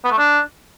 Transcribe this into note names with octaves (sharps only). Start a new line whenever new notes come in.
B3
A3
D4